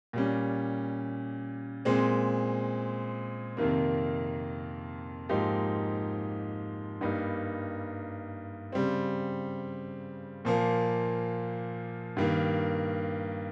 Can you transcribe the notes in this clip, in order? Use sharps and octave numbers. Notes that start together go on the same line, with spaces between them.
A#2 G3 C#4
A#2 G#3 C4
F2 C3 D#3 A#3
G#2 F3 A#3 D#4 G4
G2 G3 A#3 D#4
C#3 G3 C4
A#2 F3 A#3
G2 D#3 A#3